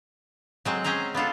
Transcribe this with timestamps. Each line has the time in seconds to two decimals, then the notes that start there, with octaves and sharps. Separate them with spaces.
0.65 F#3 G#3 C4
0.84 C4 C#4 G#4 C5 A#5
1.14 B3 D4 F4 A4